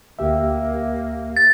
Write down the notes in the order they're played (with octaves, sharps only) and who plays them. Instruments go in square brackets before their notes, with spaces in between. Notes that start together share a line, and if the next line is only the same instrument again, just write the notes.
[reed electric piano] D2 G4 E5 [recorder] A#3
[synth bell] A6